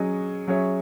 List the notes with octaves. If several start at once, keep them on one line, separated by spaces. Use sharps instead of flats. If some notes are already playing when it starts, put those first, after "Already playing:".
Already playing: F#3 C#4 G#4 D#5
F#3 C#4 G#4 C#5 E5